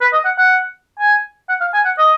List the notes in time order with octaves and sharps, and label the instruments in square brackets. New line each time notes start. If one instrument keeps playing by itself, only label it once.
[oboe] B4
D#5
F#5
F#5
G#5
F#5
F5
G#5
F#5
D#5